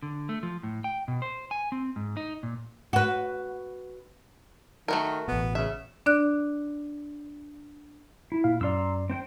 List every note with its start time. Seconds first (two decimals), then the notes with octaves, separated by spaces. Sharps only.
0.03 D3
0.29 A3
0.43 F3
0.63 A2
0.84 G5
1.08 B2
1.22 C5
1.51 G#5
1.72 C4
1.96 G#2
2.17 D#4
2.43 A#2
2.93 F#4 B4
4.88 D#3 A3 F#4 A#4
5.28 A1 B2 B3
5.55 C#3 E5
6.06 D4 D5 F#6
8.32 E4
8.44 A#2 F5
8.61 F#2 D5 A#5 C6 E6
9.10 C4 C5 G5